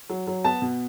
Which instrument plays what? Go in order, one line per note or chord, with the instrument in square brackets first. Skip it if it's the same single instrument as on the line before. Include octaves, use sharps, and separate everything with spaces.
[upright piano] F#3
F#3
B3 A5
B2